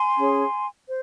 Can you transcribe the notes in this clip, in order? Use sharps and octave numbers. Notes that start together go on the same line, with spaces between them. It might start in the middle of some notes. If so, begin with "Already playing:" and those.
Already playing: G#5 C6
C#4 G#4 C#5
C5